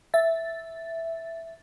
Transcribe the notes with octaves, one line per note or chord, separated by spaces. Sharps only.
E5 A6